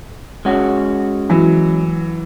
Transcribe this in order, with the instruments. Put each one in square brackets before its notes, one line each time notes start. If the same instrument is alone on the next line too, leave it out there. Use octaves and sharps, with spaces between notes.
[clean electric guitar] G#3 C#4 F#4
[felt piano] E3 F#3